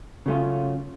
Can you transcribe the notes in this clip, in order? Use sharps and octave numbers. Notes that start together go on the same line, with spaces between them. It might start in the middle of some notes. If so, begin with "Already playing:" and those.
C#3 F#3 A3 C#4 F4